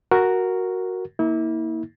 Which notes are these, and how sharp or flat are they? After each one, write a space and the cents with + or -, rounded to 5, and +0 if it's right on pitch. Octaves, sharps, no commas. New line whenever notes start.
F#4 +0 A#4 +0
A#3 +0 E4 -35